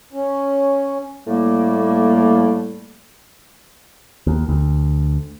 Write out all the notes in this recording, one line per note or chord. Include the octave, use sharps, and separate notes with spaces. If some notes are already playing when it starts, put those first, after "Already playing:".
C#4
A2 G3 A3 A#3
D#2
D2